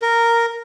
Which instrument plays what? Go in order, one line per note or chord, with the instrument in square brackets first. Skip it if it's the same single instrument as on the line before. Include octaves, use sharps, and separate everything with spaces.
[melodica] A#4